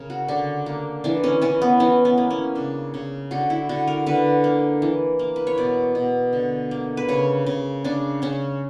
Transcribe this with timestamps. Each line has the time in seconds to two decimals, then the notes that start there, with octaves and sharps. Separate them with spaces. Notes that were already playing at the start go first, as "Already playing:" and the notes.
Already playing: C#3 A#4
0.10 F#4
0.28 D3 D4
0.66 A#3
1.04 E3 D4
1.24 C#4
1.42 E3 C#4
1.62 B3
1.80 E3 C#4
2.05 B3
2.18 A#3
2.30 C#4
2.55 C#3 D4
2.94 C#3
3.31 D3 F#4
3.50 E4
3.69 D3 F#4
3.87 A#4
4.06 D3 B4
4.44 A#3
4.82 E3
5.19 A#3
5.36 B4
5.47 C#5
5.58 B2 D5
5.95 B2
6.33 D3
6.71 A#3
6.97 B4
7.08 C#3 C#5
7.46 C#3
7.84 C#3 D4
8.22 C#3 C#4